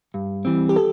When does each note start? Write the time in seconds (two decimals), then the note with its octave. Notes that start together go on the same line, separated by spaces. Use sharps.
0.14 G2
0.45 E3 G3 C4
0.69 G4
0.76 A4